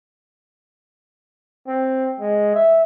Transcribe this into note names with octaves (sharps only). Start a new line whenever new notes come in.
C4
G#3
E5